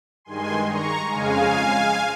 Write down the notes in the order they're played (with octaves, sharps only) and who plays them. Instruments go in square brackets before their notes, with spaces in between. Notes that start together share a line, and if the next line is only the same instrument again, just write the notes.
[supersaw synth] G2 D#3 G#3 G#5 C6
A#5 C#6
F2 C#3 G#3 F5 G#5